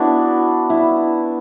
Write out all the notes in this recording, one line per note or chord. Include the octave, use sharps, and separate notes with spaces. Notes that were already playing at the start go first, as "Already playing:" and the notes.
Already playing: B3 D4 E4 F#4
E4